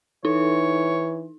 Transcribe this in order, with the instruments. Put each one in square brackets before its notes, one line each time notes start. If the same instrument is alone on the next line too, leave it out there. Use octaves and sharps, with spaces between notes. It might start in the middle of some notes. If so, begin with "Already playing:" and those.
[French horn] E3 [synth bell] D#4 [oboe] C#5